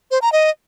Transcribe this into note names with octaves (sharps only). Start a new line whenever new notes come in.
C5
A#5
D#5